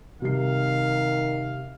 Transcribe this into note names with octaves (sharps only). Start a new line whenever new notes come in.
C3 D#3 G3 F5 C7